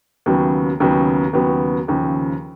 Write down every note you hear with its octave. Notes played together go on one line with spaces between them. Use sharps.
D#2 C#3 F#3 B3
D#2 C#3 F#3 B3
D#2 C#3 F#3 B3
D#2 C#3 F3